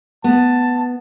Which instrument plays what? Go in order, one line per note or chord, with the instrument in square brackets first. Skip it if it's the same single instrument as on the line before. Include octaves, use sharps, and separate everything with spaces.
[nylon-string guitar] B3 [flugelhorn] A5